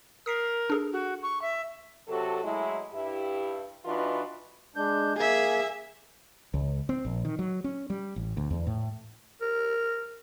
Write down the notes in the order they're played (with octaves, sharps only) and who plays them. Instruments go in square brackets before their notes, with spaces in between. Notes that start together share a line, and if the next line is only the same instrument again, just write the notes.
[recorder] A#4 [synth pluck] D#6 B6 C7
[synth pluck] D4 G#4 A4
[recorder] F#4
C#6
E5
[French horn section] C3 F#3 F#4 A4
F#3 G#3 A3 E4
G2 E4 G4
E3 D4 D#4 F4 F#4 B4
[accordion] G#3 D4 G6
[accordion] A#3 [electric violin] G#4 E5
[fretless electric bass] C#2
C4
A#1
D#3
F#3
C#4
G3
A1
D2
E2
A2
[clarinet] A#4